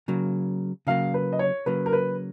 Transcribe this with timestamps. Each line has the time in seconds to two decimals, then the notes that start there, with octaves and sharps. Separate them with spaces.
0.08 C#3 F#3 A#3
0.87 C#3 F#3 A#3 F5
1.14 B4
1.32 D#5
1.39 C#5
1.66 C#3 F#3 A#3 B4
1.86 A#4
1.93 B4